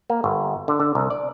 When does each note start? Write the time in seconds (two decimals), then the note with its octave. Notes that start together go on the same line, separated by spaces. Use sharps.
0.10 A#3
0.24 G1
0.68 D3
0.80 D3
0.95 C2
1.10 D5